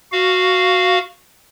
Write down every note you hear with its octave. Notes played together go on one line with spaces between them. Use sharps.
F#4 F5